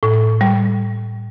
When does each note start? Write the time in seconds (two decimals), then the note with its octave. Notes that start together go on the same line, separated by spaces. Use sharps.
0.03 A2
0.41 G3